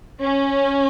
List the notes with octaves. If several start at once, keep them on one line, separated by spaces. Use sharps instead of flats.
C#4